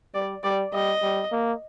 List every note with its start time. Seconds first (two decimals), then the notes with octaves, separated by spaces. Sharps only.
0.14 G3 D5
0.43 G3 D5
0.73 G3 D#5
1.02 G3
1.32 A#3